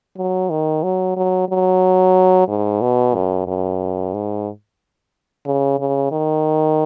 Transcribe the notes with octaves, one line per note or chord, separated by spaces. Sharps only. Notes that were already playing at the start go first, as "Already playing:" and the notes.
F#3
D#3
F#3
F#3
F#3
G#2
B2
F#2
F#2
G#2
C#3
C#3
D#3